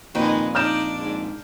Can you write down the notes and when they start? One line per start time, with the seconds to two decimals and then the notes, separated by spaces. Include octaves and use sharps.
0.15 F2 A#2 D#3 G#3 B4
0.55 D4 D#4 D5 F6 G6 E7
0.98 G#2